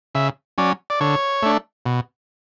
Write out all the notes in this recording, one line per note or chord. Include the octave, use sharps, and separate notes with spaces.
C#3 E5
F#3 C#4 D5
D5
D3 C#5
A3 D4
B2